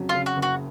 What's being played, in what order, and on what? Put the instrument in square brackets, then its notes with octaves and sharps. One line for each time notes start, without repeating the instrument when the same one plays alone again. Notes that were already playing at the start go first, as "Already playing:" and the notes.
Already playing: [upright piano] F2 C#3 F#3
[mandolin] F4
[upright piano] C#3
[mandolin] F#4
[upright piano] F#1
[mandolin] F#4